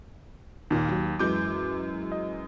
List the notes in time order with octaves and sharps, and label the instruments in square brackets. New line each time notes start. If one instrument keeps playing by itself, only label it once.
[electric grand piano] D#2 [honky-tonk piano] A#2 D#3
[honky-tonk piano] F#3
[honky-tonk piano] F#2 E3 G#3 [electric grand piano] D6 G6
[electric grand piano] D#5